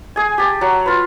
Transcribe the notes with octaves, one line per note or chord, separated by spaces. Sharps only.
G#4 G#5
G4 A5
F#3
F4 B4